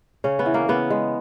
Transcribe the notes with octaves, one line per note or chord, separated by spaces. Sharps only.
C#3 C#4
B3
E3
A#3
C#3 B3
G#3